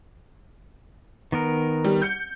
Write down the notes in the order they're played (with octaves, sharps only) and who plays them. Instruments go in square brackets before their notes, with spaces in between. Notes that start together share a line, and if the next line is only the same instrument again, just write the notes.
[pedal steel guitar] D#3 B3 A#4
[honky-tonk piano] G3
G6 C#7